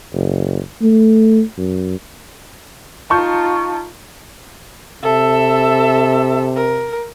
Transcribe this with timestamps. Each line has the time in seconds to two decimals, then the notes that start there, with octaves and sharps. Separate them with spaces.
0.13 F#1
0.82 A3
1.57 F#2
3.10 D#4 F4 A5 C#6 G6
5.03 C3 A4 E5
6.55 A#4